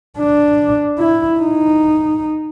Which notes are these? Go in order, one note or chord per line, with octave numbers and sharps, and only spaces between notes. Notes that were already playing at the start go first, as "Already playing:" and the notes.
D4
E4
D#4